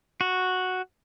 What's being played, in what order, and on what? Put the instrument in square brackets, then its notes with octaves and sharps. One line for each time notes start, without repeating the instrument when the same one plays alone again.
[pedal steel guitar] F#4